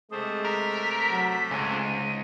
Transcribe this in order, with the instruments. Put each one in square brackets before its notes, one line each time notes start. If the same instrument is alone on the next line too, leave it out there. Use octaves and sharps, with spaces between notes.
[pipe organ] C3 A3 C5 [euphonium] G#3 [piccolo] D#6
[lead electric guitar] A#4 [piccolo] B6
[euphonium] F#3
[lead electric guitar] C#2 [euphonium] G#2 [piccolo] G#5
[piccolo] D#7